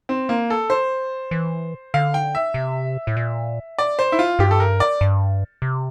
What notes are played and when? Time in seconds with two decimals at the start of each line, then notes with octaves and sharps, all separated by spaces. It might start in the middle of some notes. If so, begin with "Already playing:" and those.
0.09 C4
0.29 A#3
0.50 A4
0.70 C5
1.31 E3
1.94 D3 F5
2.14 G5
2.35 E5
2.54 C3
3.07 A2
3.16 A#2
3.79 D5
3.99 C5
4.12 E4
4.19 F4
4.39 G2 G4
4.51 A4
4.60 A#4
4.80 D5
5.01 G2
5.62 C3